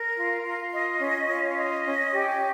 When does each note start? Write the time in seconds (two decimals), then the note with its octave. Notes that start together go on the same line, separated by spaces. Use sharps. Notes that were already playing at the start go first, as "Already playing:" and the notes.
Already playing: A#4
0.16 F4
0.43 F4
0.71 D#5
1.00 C#4
1.27 F4
1.57 D#5
1.84 C#4
2.13 G4